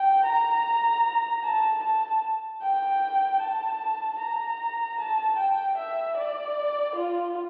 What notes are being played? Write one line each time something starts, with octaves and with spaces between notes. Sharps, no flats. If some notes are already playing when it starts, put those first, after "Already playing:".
Already playing: G5
A#5
A5
A5
G5
A5
A#5
A5
G5
E5
D5
F4